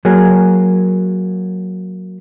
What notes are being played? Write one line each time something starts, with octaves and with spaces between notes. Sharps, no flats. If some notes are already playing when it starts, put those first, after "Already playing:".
F#3 A#3 G#4